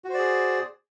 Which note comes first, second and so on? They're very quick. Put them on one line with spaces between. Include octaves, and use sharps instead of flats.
F#4 C5 D5 G#4